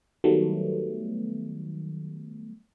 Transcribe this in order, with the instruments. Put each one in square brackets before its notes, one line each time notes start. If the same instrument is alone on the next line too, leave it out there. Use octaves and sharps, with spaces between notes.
[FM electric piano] D#3 F#3 G3 A3 B3